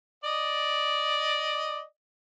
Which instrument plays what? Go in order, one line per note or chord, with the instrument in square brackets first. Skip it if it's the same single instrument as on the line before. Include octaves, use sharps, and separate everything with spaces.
[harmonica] D5 D#5